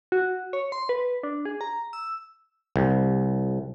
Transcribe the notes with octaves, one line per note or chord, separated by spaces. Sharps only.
F#4
C#5
C6
B4
D4
G#4
A#5
E6
C2